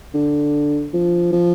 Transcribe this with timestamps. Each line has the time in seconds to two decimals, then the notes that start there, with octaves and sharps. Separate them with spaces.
0.14 D3
0.93 F3
1.32 F3